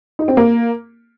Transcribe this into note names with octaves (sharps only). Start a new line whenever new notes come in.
D#4
C4
A#3